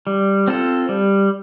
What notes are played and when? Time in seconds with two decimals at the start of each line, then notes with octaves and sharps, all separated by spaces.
0.07 G3
0.48 C4 F4 A4
0.89 G3